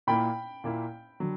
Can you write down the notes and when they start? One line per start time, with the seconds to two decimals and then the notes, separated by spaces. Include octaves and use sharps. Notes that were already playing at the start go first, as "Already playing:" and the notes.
0.07 A#2 A#3 E4 G5 B5
0.64 A#2 A#3 E4
1.20 D3 F#3